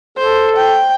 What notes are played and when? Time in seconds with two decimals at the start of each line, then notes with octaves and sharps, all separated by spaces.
0.18 A4 C5
0.56 G5